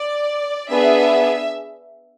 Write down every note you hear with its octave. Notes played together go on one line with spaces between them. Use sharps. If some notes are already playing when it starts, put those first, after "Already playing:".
Already playing: D5
B3 D4 G#4 E5